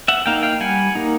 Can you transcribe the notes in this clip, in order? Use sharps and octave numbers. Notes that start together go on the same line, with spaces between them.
E5 F#5
A#3 D#4 F5 G5
F5 G5
G3 F#5 G#5
A#3 D#4